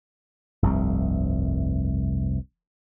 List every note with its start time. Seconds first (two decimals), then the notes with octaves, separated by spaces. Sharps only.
0.62 F1 C2 G2 C3